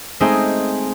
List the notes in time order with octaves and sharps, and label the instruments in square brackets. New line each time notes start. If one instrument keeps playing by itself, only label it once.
[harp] G#3 A3 C4 D#4 C5 G#5